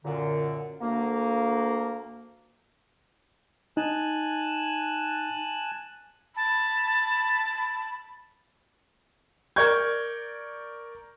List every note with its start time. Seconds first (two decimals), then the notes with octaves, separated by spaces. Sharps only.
0.05 F#2 A#2 D3
0.81 D2 A#3
3.77 D#4 G#5 A5 F#6
6.36 A5 B5
9.56 A#4 D5 C#6 G6 G#6